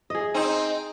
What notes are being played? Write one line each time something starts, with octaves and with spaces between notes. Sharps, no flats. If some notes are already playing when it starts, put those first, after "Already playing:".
G#4 D#5
C4 D#4